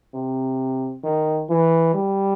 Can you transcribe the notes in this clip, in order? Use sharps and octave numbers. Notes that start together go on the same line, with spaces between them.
C3
D#3
E3
G3